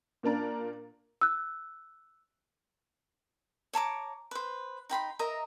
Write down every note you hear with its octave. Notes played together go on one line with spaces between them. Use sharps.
A#2 A#3 D4 A#4
E6 F#6
C#5 A5 A#5 D6
B4 C5
D#4 G5 B5 C6
A#4 D#5 E5 A#5